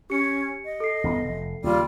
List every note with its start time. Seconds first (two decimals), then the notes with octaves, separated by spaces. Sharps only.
0.10 C#4 G4 C#7
0.65 D#5
0.80 A4 C7
1.04 G1 E2 B3
1.25 F1
1.64 D#2 C#3 G3 F4